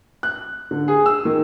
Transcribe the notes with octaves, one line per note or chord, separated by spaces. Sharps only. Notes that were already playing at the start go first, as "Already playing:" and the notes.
F#6
D3
G#4
E6
D#3